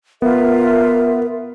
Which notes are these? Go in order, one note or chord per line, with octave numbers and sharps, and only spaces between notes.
B3 F4 A#4 E5